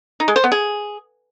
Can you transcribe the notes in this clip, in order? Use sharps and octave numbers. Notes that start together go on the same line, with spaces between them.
D#4
G#3
C5
B3
G#4